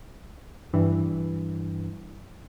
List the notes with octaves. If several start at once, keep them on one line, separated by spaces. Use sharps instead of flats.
G2 E3